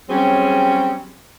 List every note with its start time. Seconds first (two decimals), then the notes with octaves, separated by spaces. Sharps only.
0.10 F#3 G3 C4 C#4 G#4 C#5